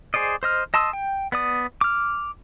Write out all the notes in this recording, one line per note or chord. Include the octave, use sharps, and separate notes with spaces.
G#4 C5 D5 D#5
C5 D#5 F6
D#5 A5 C6 D#6 E6
G5
B3 D5 D#6
D6 F6